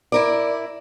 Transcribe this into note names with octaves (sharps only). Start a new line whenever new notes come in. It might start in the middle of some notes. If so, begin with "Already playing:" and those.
E4 A#4 D5